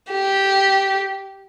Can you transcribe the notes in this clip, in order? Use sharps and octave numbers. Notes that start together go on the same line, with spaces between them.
G4